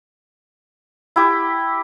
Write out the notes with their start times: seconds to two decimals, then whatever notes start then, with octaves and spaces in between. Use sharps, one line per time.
1.16 E4 G4